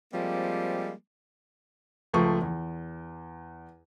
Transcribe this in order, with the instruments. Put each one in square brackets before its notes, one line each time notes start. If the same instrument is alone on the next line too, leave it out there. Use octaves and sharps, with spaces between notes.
[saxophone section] F3 G3 G#3 A#3 C4
[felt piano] C#2 F3 A3 C#6
E2